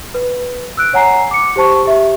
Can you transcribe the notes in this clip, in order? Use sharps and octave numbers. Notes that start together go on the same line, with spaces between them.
B4
E6 F#6 D7
C#5 F#5 G#5 A#5 C7
D6 C#7
G4 C5 A5 C#6
G4 E5